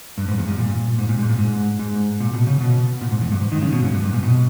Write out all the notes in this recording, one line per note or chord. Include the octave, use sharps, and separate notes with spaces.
G2
G#2
E2
G2
A#2
G#2
A#2
G#2
A#2
G#2
G#2
A#2
B2
C#3
B2
A#2
G#2
E2
G2
G#2
D#3
C#3
B2
G#2
G2
G2
A#2
B2